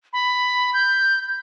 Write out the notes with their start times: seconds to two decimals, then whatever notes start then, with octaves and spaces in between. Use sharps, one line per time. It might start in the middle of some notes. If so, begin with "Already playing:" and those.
0.13 B5
0.74 G6